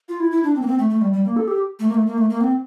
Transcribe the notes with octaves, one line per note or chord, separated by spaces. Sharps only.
F4
E4
E4
D4
C4
A#3
C4
A3
A3
G3
G3
A#3
A4
G4
A3
A#3
A3
A#3
A3
A#3
C4